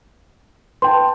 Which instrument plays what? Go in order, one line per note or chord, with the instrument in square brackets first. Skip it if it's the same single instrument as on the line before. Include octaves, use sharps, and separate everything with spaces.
[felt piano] B4 G5 A5 [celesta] C6